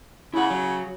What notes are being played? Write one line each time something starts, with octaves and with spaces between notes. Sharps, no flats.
C#3 E4 F#5
F#3